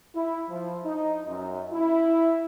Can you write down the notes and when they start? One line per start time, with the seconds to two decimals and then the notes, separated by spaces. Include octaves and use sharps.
0.15 E4
0.49 F3
0.85 D#4
1.26 F#2
1.72 E4